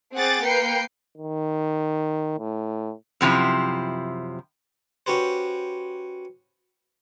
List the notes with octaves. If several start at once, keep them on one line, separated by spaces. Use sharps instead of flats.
C4 G#4 F#5 D6 A6
A#3 B4 G5 C7 C#7
D#3
A2
F#2 C3 F3 E4
C#4 F#4 G4 B4 C5